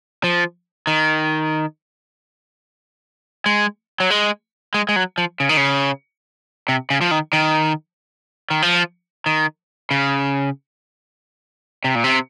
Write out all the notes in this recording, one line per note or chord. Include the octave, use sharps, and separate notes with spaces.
F3
D#3
G#3
F#3
G#3
G#3
G#3
F#3
F3
C#3
D#3
C#3
C3
C#3
F3
D#3
D#3
D#3
F3
D#3
C#3
C3
A#2
C3